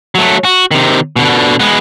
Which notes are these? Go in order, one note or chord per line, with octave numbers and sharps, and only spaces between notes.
F#3 A3
F#4
C3 D#3
B2 D3
G#3 B3